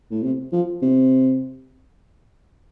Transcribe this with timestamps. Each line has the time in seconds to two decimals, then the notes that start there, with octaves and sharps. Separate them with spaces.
0.11 A2
0.23 C3
0.52 F3
0.82 C3